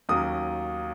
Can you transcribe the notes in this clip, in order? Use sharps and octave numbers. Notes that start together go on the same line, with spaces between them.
D#2 D#3 F#3 C#4 D#6